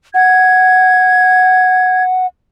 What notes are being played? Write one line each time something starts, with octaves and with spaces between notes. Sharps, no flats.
F#5 G#6